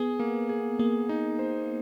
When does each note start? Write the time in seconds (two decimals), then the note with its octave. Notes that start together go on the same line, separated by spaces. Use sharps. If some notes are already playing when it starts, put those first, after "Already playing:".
Already playing: B3 G#4
0.19 A#3
0.49 G#4
0.79 A#3 G#4
1.09 D#4
1.39 C5